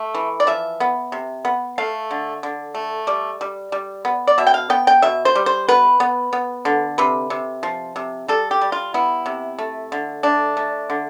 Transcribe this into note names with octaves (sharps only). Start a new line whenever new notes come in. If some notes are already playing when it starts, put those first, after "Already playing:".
Already playing: A3
E3
D5
F3 E5
B3
C3
B3
A3 F5
D3
D3
A3
G3 D5
G3
G3
B3
D5
B2 E5
G5
F5
B3 G5
G5
B2 E5
C5
G3
C5
B3 B4
B3
B3
D3
C3 B4
C3
F3
C3
G3 A4
G4
G3
F4
B3 E4
C3
A3
D3
A3 D4
A3
D3